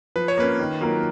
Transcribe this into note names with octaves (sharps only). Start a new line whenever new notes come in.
F3 B4
C#5
A#3 C#4 B4
D#3
F#3 A#3 F4 A#4